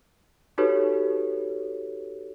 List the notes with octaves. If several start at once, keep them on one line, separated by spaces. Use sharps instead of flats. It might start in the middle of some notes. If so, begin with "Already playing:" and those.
D#4 F#4 G4 A4 B4 C#5